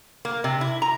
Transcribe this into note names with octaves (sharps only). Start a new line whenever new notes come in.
A#3
C3
E4
A#5